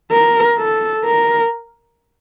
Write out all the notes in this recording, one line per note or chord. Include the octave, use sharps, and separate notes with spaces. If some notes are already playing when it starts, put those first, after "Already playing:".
A#4
A4
A#4